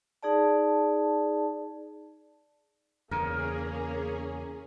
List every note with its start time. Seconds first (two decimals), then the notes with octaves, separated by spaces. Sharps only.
0.23 D#4 G#4 D5 A5
3.11 E2 C#3 A#3 C#4 G#4 A#4